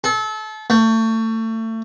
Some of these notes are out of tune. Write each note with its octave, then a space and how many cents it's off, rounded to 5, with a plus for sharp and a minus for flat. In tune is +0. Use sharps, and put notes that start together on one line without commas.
A4 -30
A3 +30